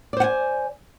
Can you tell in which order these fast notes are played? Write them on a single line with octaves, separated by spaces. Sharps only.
D5 C5 F#5 G#5